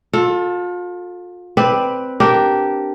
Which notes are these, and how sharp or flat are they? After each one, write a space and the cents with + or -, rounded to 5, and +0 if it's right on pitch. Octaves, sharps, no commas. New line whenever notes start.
F4 +35 A4 +0
C4 -5 B4 +0 D5 +10
D4 +0 G4 -10 A#4 +0